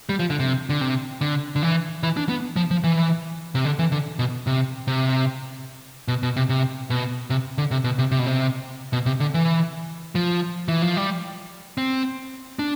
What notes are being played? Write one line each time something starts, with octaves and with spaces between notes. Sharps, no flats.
G3
F3
D3
C3
D3
C3
D3
D3
E3
E3
D4
B3
F3
F3
E3
C3
D3
E3
D3
B2
C3
C3
B2
B2
C3
C3
B2
C3
D3
C3
B2
C3
C3
B2
C3
B2
C3
D3
E3
F3
E3
F3
G3
C4
D4